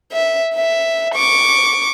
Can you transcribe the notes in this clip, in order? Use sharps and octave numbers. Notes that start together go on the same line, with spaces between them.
E5
E5
C#6 D6